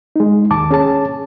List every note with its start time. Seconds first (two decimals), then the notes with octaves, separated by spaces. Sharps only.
0.16 G#3 D#4
0.51 D#2 A5 D6
0.71 C#4 G#4 A5